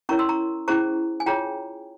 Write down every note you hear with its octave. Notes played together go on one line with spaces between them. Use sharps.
C#4 E4 A#4 C#5 A#5 C#6
C6 E6
A#5 C#6
C#4 E4 G#4 C5 A#5 C#6
G#5
F4 G#4 C#5 G5 A#5